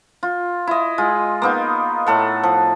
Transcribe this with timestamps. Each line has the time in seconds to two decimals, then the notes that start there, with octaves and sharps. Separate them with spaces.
0.23 F4
0.67 E4 D#5
0.98 G#3 F4
1.42 A#3 B3 D#4
2.07 A2 A4 F#5
2.43 F3